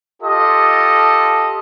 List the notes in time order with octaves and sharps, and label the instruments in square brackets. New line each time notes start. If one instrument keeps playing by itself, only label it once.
[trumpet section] F4 G4 A4 D#5